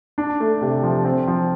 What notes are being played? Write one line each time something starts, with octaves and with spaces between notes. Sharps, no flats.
D4
A3
C3
F3
C4
F3